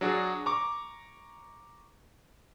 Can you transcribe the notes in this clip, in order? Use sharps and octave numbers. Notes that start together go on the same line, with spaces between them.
F#3 D4 F#4 G#4
A#5 C#6 D6